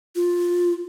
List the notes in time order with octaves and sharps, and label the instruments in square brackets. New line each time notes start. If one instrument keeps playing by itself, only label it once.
[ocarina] F4